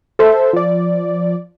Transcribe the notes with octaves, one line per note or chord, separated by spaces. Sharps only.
A4 C5 E5
F3 D5